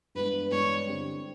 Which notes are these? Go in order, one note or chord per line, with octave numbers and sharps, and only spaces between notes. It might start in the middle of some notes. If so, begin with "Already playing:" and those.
G2 E3 G#3 B3 D4 B4
G2 E3 G#3 B3 D4 C#5
D3 G3 C4